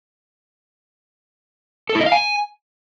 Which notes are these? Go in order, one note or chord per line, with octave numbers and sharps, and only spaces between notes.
A4
E4
D#5
F5
G#5